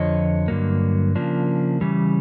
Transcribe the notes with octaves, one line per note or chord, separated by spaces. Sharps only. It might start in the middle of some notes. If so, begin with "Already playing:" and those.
Already playing: F2 D3 F3 C#5 D#5
G2 D3 F#3 A#3
C#3 F3 A#3 D4
C#3 E3 G3